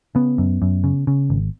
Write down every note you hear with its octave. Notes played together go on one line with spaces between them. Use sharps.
C#3 B3
F#2
F#2
C#3
C#3
G#1